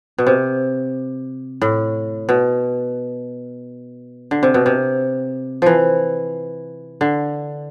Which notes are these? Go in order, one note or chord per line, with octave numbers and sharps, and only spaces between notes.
B2
C3
A2
B2
D3
C3
B2
C3
E3 F3
D3